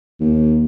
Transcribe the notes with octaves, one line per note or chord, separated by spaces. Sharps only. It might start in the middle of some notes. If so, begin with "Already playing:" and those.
D#2